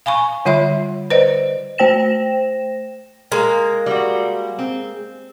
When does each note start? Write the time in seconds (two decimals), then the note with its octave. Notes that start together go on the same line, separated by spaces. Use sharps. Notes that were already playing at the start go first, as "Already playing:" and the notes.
0.06 F5 G#5 B5 C#6
0.45 D3 G3 F4 C#5 E5 B5
1.10 B4 C5 D5 D#5
1.78 A3 C5 G5 A#6 E7
3.32 G#3 A#3
3.86 G3 F#4
4.59 C4